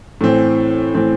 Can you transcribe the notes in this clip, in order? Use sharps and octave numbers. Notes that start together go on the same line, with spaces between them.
A2 E3 C4
A2 E3 C4